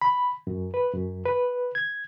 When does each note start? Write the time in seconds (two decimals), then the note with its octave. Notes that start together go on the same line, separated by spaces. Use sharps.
0.01 B5
0.47 F#2
0.74 B4
0.94 F#2
1.26 B4
1.75 G#6